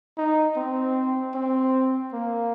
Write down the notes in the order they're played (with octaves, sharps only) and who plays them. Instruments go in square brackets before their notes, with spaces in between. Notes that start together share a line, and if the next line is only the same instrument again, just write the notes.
[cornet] D#4
C4
C4
A#3